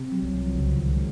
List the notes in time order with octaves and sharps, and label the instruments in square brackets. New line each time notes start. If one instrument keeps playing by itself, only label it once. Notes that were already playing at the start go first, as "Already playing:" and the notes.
Already playing: [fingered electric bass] C3
[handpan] F#3
[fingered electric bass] C2
[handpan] F3
[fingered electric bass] C#2 [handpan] C#3
[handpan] D#3
[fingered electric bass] G#3